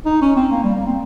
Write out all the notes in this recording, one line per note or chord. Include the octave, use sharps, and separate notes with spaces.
D#4
C#4
C4
A#3
G3
A#3
C4